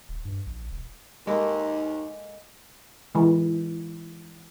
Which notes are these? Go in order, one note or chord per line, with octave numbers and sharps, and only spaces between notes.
D#1
G2
A#1
E1
D#2 G#3 A#3 A4
E3 G#3